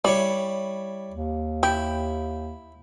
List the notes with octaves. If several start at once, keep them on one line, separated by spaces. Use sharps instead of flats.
G3 E4 C#5 D5
D#2
E4 G4